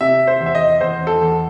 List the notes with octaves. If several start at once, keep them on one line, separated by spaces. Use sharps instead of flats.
C3 E5
C5
E2
E5
D#5
E2 C5
A4
E2